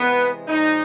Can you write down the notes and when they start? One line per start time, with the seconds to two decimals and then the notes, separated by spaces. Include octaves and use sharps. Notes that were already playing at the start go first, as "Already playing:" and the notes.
Already playing: C3 E3 G#3 B3
0.48 A#2 F3 G#3 D#4